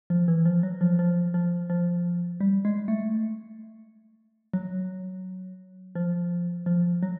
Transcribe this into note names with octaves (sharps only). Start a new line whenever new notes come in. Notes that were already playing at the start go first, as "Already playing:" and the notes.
F3
E3
F3
F#3
F3
F3
F3
F3
G3
G#3
A3
F#3
F3
F3
F#3